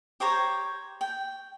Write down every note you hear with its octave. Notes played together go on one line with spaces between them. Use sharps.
G4 C5 C#5 A#5
G5